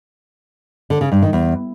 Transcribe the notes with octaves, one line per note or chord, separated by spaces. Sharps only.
D3
C#3
G2
D#3
E2